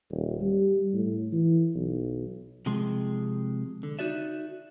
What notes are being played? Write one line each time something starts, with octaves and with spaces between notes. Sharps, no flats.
D#1
G3
A2
E3
B1
C3 F3 G#3 C6
D3
D#4 F#4 D5 E5